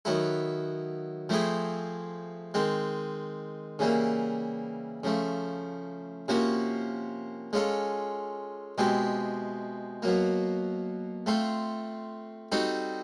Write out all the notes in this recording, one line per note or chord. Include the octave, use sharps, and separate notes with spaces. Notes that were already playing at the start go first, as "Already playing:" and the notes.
D#3 F#3 B3 E4 A4
F3 A3 C4 E4 G#4
D#3 G#3 C4
C#3 E3 G3 A#3
C#3 F3 A3
C3 F3 A#3 C#4 F#4
G#3 C#4 F4 A4
B2 G#3 C4 E4 G4
B2 F#3 A#3
A3 C4 F4 A4
G3 C4 D#4 F#4 A4